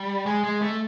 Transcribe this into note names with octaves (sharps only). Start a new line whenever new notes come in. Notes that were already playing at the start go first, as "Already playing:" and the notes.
Already playing: G3
G#3
G#3
A3